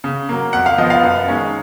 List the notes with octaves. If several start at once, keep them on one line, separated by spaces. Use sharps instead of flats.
C#3
F#3 A#3
F2 F#5
F5
F3 B3 D#5
F5
F#2
D#3 G#3 C#4